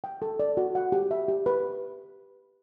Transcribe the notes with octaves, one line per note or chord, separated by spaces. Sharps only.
G5
A4
D5
F#4
F#5
G4
E5
G4
B4